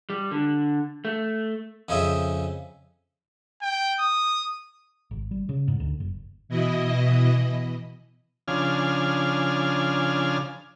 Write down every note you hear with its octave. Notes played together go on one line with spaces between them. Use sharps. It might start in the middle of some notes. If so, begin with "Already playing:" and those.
G3
D3
A3
F2 C#3 G#4 C5 D#5 E5
G5
D#6
G#1
G3
C#3
G#2
D2
F#1
B2 E3 E4 D#5
C#3 F3 D4 G#5 F6